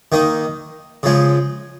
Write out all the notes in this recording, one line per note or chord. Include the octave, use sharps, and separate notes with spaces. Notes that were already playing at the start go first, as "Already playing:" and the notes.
D#3 A#3 D#4
C#3 F3 G#3